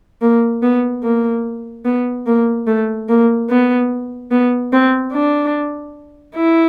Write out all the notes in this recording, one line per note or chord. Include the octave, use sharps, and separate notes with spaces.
A#3
B3
A#3
B3
A#3
A3
A#3
B3
B3
C4
D4
E4